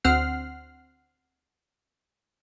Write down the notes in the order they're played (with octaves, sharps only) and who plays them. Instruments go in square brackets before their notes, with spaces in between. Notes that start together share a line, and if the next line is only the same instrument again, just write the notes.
[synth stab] D2 C4 F#5 F6 C7